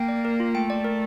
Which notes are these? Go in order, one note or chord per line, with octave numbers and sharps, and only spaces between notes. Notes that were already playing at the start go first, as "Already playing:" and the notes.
Already playing: A#3 G5
D5
A#4
F4
A3 G5
D5
A#4